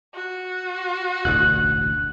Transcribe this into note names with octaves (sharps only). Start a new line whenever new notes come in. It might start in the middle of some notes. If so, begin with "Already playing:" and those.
F#4
E1 A1 D2 F#6